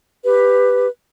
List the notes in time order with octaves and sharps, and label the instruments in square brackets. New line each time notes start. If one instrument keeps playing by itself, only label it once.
[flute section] G4 B4